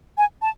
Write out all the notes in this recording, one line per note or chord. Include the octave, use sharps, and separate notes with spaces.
G#5
A5